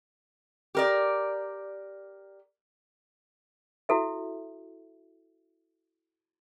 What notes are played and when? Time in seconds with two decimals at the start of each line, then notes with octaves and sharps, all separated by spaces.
0.75 G4 A#4 D5
3.89 E4 F#4 A4 E5